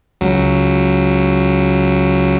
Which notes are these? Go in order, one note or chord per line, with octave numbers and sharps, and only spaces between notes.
C#2 F#3